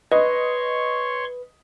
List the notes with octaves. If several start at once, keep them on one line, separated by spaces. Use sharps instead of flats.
B4 C#5 D#5 C6 C#6